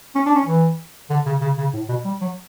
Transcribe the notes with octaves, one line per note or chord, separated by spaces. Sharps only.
C#4
D4
C#4
E3
D3
C#3
C#3
C#3
A2
B2
G3
F#3